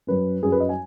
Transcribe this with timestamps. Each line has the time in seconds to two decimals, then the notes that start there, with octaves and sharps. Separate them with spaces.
0.07 F#2 F#3 C#4 B4
0.42 F#2 F#3 C#4 G#4
0.52 B4
0.60 D#5
0.69 G#5